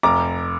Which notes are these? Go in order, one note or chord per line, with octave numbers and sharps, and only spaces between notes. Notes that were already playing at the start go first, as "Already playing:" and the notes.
F1 A#5 D6